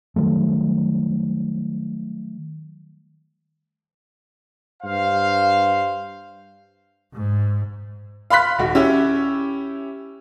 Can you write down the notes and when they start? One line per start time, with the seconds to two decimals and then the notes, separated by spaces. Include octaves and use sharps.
0.16 D#3 F#3 G3 A3
4.83 G2 C5 F5
7.14 G#2
8.30 F5 B5 C6 F#6 B6
8.59 D#1 F#4
8.75 C#4 E4 G4 C#5